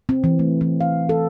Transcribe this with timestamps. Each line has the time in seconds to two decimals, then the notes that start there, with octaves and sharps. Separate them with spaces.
0.09 C4
0.24 E3
0.39 A3
0.61 E3
0.81 F5
1.09 A4